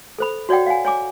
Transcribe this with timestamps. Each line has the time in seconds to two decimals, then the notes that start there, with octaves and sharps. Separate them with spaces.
0.18 A4 C5 B5
0.49 F#4 C#5 D5 F#5 G5
0.66 F5 F#5 G#5
0.85 C#5 G#5 D6